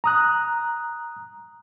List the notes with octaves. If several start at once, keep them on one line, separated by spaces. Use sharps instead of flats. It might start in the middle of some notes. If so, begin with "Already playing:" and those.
A#5 D#6 F#6